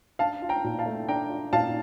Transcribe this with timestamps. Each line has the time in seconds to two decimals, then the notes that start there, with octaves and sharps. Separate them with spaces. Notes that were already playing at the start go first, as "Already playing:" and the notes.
0.19 D4 F5 A5
0.42 F4
0.49 G5 A#5
0.64 A#2
0.79 F5 A5
0.86 A3
1.08 D4 G5 A#5
1.30 F4
1.53 A#2 F5 A5